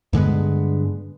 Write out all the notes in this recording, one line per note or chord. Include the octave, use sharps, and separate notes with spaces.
G2 D3 G#3 B3